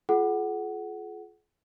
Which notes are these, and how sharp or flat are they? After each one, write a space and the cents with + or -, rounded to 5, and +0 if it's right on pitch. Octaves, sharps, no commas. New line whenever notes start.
F4 +0 G#4 +40 F#5 +10